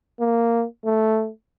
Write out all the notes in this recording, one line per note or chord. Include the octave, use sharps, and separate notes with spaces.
A#3
A3